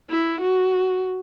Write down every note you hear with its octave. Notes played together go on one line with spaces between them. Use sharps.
E4
F#4